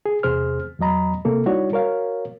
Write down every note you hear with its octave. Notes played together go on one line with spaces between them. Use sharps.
G#4
E2 C3 G#4 C5 F6
E2 F#3 D#5 A#5 B5
C3 A#3 A4
G3 D#4 E4 F#4 C#5 D5
F#4 A#4 C#5 F5